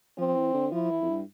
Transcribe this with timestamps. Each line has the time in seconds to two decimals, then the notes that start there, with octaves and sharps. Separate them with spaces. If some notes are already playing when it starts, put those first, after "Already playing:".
0.18 F3 C4
0.36 E3
0.53 D3
0.72 F3 E4
0.90 E3
1.01 F2
1.09 G2